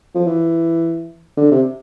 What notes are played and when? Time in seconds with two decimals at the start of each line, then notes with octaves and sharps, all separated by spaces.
0.15 F3
0.27 E3
1.37 D3
1.51 C3